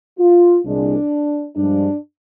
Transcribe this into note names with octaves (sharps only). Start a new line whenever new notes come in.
F4
C2 A#2 G#3 D4
G2 F3 G#3 D4